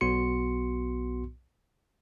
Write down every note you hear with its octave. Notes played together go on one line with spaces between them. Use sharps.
B1 B3 F#4 C6 C#7